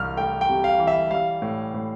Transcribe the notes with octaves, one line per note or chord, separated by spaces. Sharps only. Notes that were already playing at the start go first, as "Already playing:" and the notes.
Already playing: C2 E3 F6
A3 G5
G5
C3
F5
E3
E5
G3 F5
A2
A2